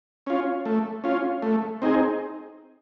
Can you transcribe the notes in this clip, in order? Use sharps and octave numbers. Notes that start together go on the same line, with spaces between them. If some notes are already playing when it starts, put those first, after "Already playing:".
C#4 F4
A3
C#4 F4
A3
C4 D#4 G#4